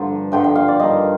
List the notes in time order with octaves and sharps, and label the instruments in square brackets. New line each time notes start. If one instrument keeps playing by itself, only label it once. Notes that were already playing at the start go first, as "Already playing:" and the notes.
Already playing: [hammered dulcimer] G2 D3 F3 A#4 C5
G2 D3 F3 G5
G5
F5
D5
G2 D#3 D#5